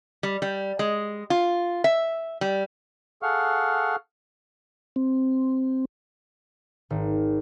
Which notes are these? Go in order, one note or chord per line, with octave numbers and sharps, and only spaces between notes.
G3
G3
G#3
F4
E5
G3
G#4 A4 F5 F#5 C#6 F6
C4
G#1